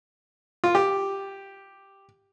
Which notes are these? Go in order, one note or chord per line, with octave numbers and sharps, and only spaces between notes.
F4
G4